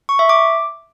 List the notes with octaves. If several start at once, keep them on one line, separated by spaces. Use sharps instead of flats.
C#6
E5
D6